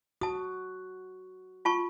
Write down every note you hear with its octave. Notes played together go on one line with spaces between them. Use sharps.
F#4 A5 D#6
F4 A5 C#6